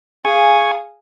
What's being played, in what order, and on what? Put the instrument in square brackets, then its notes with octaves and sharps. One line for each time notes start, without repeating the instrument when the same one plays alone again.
[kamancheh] G#4 F5 [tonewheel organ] G#5 C#6